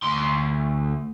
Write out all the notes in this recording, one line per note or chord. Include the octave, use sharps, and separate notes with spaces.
D2 C6